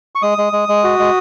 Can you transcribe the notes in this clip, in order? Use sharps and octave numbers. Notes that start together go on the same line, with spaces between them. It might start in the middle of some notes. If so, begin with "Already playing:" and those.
C#6
G#3 D#6
G#3
G#3
G#3
F#4
G#3